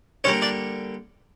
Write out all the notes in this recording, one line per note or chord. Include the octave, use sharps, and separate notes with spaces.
D3 G3 A#3 C#4 C#5
D4 D5